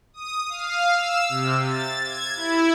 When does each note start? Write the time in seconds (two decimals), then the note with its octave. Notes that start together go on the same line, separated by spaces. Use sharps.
0.14 D#6
0.49 F5
0.92 E6
1.29 C3
1.64 A6
2.04 G#6
2.36 E4